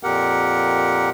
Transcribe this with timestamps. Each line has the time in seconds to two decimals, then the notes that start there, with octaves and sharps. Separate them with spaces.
0.03 F2 A#2 G4 A#4 F#5